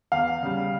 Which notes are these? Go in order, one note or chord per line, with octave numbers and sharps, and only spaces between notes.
E2 F5
C#3 G3